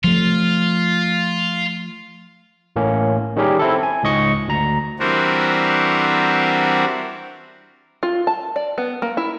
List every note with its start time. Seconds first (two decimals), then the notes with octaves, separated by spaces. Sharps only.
0.04 F3 A3 F4
2.76 A1 A2 A#3 C#4
3.36 D#3 G3 C#4 G4 G#4 A#4
3.59 C4 E4 A4
3.83 G#5
4.03 C#2 G#2 D#5 C#6 C#7
4.48 D2 A#5
4.99 E3 G3 C4 D4 F#4 A#4
8.03 F4
8.27 A5
8.56 D5
8.78 B3
9.02 A#3
9.17 E4